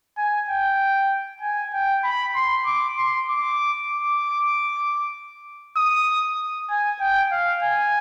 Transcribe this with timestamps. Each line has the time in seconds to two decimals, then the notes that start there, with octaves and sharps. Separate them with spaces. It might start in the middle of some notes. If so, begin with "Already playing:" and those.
0.18 G#5
0.49 G5
1.42 G#5
1.73 G5
2.04 B5
2.35 C6
2.66 D6
2.98 C6
3.28 D6
3.90 D6
5.77 D#6
6.70 G#5
7.00 G5
7.32 F5
7.63 G#5